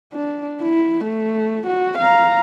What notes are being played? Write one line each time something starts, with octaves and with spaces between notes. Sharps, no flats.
D4
E4
A3
F#4
F5 A#5